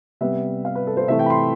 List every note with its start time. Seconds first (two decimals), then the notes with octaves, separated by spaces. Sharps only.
0.21 C3 G3 B3 E5
0.65 F5
0.75 B4
0.87 A4
0.97 C5
1.08 C3 E3 A3 E5
1.19 G5
1.26 B5
1.30 C6